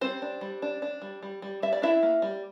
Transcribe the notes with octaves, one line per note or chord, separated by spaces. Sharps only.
G3 C4 C5
D4
G3
D4
D4
G3
G3
G3
G3 E5
D5
D4 E4 E5
A#3
G3